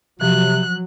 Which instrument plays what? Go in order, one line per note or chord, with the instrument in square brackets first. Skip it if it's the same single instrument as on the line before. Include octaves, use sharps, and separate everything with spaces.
[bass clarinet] C3 [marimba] F3 [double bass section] F#3 [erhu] F#6